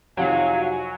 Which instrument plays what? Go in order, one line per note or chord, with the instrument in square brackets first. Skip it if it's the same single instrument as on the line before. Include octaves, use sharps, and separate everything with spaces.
[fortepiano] F2 C3 D#3 [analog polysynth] F#3 [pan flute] F5 [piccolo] G#5